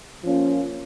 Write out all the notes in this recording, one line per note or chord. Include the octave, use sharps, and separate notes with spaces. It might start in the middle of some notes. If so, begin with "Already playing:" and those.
F3 A#3 C#4 F4